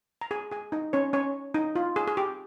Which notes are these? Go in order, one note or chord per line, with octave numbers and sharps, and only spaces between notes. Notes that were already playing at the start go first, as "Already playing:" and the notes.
A#5
G#4 G#5
G#4 G#5
D#4 D#5
C#4 C#5
C#4 C#5
D#4
F4
G#4
G#4
G4